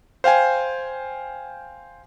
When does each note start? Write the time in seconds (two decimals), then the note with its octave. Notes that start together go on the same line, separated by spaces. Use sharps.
0.24 C5 F5 G5 G#5